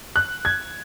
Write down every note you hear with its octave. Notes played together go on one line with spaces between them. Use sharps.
F#6
G#6